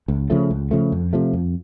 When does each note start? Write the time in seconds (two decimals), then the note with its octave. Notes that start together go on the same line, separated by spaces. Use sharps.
0.08 C#2
0.30 C#3 F3 A3
0.50 C#2
0.71 C#3 F3 A3
0.92 F2
1.13 C3 F3 A3
1.33 F2